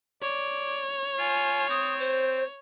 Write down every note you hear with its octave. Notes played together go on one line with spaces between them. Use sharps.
C#5 D5
F4 G#5
C4 D#6
C5